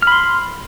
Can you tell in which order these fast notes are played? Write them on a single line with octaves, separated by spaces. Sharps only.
F6 B5 C6